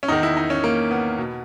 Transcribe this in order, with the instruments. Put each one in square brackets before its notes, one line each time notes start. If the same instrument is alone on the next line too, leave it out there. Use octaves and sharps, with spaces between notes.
[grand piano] C#4
E2 D#3 D#4
E4
D#4
C#4
A#3
B3
B2